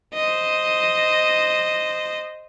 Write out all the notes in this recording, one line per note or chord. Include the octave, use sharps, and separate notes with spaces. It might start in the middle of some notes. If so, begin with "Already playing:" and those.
C5 D#5